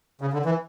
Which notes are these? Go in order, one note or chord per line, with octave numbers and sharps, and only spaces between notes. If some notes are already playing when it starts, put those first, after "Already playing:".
C#3
D3
E3